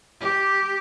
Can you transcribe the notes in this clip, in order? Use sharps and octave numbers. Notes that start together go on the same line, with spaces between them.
G4